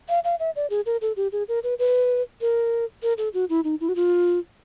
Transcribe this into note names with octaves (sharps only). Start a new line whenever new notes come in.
F5
F5
E5
D5
G#4
A#4
A4
G4
G#4
A#4
B4
B4
A#4
A#4
A4
F#4
E4
D#4
E4
F#4
F4